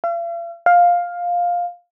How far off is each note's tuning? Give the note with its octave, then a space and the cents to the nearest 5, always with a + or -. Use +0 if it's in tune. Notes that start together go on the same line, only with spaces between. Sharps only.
F5 -45
F5 +10